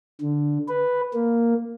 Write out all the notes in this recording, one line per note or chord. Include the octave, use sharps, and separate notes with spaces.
D3
B4
A#3